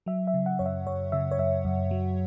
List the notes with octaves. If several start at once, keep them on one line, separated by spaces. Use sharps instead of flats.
F#3 E5
E5
C#3
F#5
F#2 C#5
E5
F#2 C#5
C#3 E5
C#5
F#2 E5
F#2
F#3